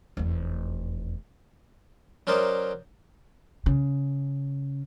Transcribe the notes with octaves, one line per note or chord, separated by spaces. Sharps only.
F1 E2
F#3 C#4 A#4 C5 D5 D#5
C#3